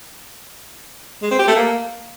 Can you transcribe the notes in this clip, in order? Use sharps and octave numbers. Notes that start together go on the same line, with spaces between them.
G#3
C4
G4
A3
A#3